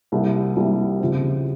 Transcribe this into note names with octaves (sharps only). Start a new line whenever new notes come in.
C2 C3 G3 A#3
C2 C3 G3 A#3
D#2 C#3 F3 C4